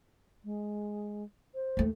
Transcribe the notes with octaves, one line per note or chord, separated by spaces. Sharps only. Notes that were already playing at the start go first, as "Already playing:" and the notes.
G#3
C5
D#2 A3